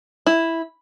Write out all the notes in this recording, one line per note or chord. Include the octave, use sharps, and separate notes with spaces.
E4